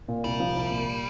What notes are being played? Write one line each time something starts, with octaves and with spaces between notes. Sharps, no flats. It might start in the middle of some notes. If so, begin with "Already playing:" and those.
A#2
C2 G3
F3
C2
A#2